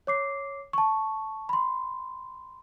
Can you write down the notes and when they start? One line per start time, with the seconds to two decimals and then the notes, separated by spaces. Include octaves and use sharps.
0.07 C#5 D6 C7
0.73 A5 C#6
1.49 B5 C6